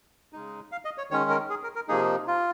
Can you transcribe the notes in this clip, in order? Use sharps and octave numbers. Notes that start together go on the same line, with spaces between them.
C#3 G#3 D#4
F5
D#5
C#5
D#3 G#3 C#4 C#5
A#4
G#4
A#4
A#4
C3 F3 A#3 D#4 G#4
F4